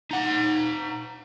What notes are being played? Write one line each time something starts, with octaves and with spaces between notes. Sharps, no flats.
D#4 F#5